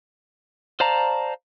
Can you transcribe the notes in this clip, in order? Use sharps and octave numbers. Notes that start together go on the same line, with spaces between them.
C5 D5 F5 A5 A#5